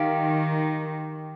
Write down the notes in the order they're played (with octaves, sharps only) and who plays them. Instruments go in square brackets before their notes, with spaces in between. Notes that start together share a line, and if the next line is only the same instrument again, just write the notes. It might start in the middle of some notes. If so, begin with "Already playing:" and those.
Already playing: [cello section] D#3 [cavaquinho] G4 F5